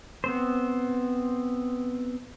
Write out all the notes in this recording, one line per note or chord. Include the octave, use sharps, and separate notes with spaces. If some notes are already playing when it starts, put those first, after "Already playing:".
B3 C4 C5